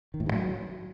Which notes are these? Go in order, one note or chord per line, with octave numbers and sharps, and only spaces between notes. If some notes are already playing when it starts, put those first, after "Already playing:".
D#3
A2
G2
F#3